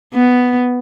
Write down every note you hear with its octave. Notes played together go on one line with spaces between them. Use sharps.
B3